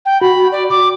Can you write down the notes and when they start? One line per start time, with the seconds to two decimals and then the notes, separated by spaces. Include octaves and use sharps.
0.06 G5
0.21 F#4 B5
0.52 D5
0.70 D6